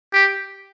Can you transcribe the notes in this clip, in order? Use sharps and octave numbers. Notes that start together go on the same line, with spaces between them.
G4